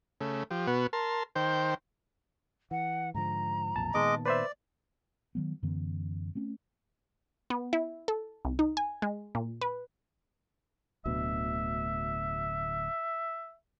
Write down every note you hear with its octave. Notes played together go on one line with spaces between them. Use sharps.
C#3 A3
F3 G4
B2 B3 F#4
A#4 A5 C6
D#3 C5 G5
E3 F#5
G#2 D3 F3 A#5
B1 F2 A#2 A5
A#2 D#3 G#3 B3 D#5 D6
B4 C5 D5 E5
D#3 F#3 B3
F#2 D3 E3 B3
A3 C4 C#4
B3
E4
A4
C2
D#4
G#5
G#3
A#2
B4
D1 D2 B2 E5